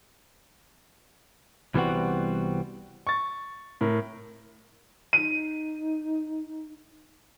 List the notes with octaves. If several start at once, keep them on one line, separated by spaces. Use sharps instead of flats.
C2 E3 G3 B3 C4 F#4
C#6 A6
A2 A#4
D#4 D#7